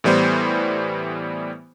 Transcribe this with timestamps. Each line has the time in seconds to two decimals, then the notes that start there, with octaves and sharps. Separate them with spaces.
0.04 A2 E3 G3 B3 C5